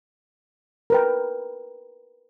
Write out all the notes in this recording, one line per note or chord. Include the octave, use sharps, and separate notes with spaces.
A#4 B4 G5